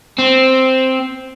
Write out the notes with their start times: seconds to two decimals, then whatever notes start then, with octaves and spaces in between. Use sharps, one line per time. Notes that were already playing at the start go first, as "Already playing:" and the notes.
0.18 C4